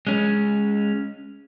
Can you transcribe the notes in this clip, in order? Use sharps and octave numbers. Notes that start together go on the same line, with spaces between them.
G#3 C#4